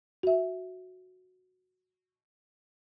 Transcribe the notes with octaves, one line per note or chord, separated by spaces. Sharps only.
F#4 E5